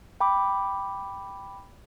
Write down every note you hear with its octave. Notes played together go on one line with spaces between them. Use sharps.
G5 B5 D6